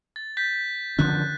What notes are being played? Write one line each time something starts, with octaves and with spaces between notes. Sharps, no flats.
A6
G6 A6 B6
D3 F3 C#4 F#6